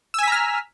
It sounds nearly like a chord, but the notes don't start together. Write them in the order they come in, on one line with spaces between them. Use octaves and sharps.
E6 G#5 B6 A#5 F6